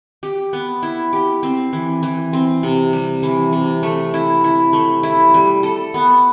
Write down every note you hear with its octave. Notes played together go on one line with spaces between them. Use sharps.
G4
B3
E4
G4
C4
E3
E3
C4
C3
G3
E3
C3
A3
E4
E4
A3
E4
G3
A4
B3